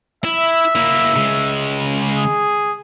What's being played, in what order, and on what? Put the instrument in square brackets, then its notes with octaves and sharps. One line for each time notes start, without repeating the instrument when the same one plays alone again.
[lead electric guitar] E4 [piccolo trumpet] E5
[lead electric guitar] A#3 E4
C#3 G#3
[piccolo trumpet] G#4